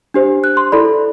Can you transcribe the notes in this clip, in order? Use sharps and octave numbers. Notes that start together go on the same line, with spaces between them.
D4 G4 C5
F#6
C6
E4 A4 D5 B5